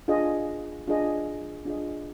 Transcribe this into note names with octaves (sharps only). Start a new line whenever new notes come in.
D4 F4 G#4 D#5
D4 F4 G#4 D#5
D4 F4 G#4 D#5